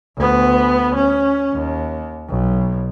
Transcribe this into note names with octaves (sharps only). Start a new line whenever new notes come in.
D2 B3
C#4
D#2
B1